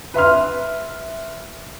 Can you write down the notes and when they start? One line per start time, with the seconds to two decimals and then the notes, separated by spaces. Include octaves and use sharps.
0.14 B4 E5 C6 F6